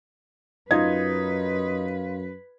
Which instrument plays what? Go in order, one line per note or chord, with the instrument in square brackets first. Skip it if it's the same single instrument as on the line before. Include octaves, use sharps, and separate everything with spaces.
[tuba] F#2 [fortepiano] D#4 [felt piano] F4 G#6 [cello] B4